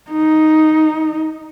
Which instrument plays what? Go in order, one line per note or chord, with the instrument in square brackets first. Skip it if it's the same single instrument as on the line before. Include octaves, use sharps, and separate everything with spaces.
[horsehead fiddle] D#4